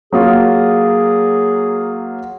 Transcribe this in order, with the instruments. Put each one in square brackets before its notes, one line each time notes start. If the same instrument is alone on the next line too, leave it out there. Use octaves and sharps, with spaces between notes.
[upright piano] F#3 A#3 F4 [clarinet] G#4